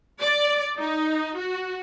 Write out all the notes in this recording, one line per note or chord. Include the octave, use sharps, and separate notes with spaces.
D5
D#4
F#4